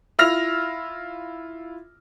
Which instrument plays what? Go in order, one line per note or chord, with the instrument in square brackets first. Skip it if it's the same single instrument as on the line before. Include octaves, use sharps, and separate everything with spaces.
[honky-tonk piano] E4 F4 E6 F6 A#6 F7